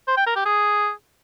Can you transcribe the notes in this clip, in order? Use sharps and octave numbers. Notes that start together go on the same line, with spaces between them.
C5
G5
A#4
G4
G#4